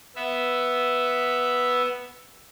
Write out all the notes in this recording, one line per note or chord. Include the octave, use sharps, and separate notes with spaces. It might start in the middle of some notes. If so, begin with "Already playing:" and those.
B3 E5